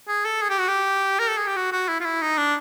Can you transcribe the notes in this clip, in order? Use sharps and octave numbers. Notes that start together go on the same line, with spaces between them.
G#4
A4
G#4
G4
F#4
G4
A#4
A4
G#4
G4
F#4
F#4
E4
F4
E4
D#4
D4